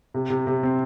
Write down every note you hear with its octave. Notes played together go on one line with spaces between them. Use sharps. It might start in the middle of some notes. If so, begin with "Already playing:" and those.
C3
C3
C3
C4